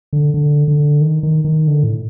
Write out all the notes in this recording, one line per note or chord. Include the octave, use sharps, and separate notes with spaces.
D3
D3
D3
D#3
D#3
D#3
D3
A2